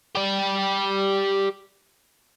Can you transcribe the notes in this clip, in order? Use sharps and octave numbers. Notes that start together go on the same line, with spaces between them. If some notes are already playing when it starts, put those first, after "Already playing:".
G4 D5